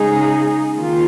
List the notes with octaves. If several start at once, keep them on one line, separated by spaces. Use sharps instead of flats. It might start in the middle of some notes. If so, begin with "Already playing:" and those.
Already playing: C#3 G#3 D#4 G#4
D#3 A#3 F4